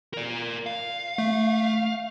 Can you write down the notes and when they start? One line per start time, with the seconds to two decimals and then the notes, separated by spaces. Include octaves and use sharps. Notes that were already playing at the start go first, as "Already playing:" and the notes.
0.14 A#4 D5
0.66 F5
1.18 A3